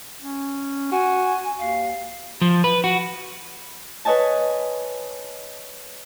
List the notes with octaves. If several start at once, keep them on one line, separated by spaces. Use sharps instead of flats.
C#4
F#4 G#5
D#2 F5
F3
B4
F#4
B4 C#5 D#5 G#5 A5